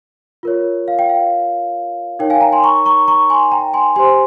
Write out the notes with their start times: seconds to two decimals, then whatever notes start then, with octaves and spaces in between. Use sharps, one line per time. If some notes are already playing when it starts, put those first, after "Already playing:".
0.43 F4 A#4 C#5
0.88 F5
0.99 G5
1.09 F5
2.19 D#4 A#4 C#5 G5
2.30 F5 G#5
2.41 G5 A#5
2.52 G#5 C6
2.64 A#5 C#6
2.86 A#5 C#6
3.08 A#5 C#6
3.30 G#5 C6
3.52 G5 A#5
3.74 G#5 C6
3.96 G4 C5 G#5 C6